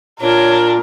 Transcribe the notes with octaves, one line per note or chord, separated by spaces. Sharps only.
A#2 D4 A#4 C#5